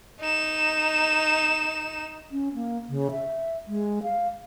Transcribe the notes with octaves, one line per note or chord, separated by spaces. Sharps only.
D#4 E7
C#4
A#3
C#3
E5
G#3
F5